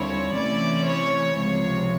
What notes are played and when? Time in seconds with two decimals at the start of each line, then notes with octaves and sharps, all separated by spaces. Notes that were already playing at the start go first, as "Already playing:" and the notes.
Already playing: D#2 D3 G3 C4 E4 C#5
0.34 C3 E3 A3 C#4 E4 D5
0.86 C#5
1.39 C#2 C3 F3 C#5